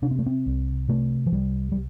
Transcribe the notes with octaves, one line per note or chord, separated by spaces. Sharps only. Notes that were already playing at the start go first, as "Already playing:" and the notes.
C3 D4
C4
A3
C4
C2
C3 A3
F3
C2 G3
G3